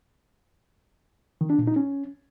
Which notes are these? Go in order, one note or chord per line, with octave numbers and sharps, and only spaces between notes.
D#3
D4
A#2
D#4
C#4